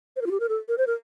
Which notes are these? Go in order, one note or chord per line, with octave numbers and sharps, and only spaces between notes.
C5
A#4
F4
G4
A#4
A4
A#4
C5
A#4